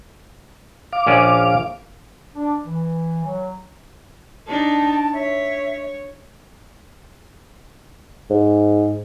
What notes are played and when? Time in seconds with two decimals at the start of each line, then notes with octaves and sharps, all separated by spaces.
0.93 F5 D6
1.07 A#1 C#4 D5
2.35 D4
2.65 E3
3.25 F#3
4.47 D4 D#4 A5
5.14 C#5 E5
8.30 G#2